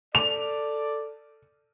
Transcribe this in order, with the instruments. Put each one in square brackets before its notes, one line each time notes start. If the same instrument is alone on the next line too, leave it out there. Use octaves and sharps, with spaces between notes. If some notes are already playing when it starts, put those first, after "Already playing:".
[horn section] A4 D5 [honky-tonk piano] F7